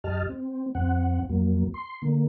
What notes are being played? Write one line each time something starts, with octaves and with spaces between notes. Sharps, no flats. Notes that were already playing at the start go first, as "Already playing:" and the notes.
F#2 G4 D#5 A5 F6
C4
F2 C4 F#5
F2 F#3 A#3
C6
D3 A#3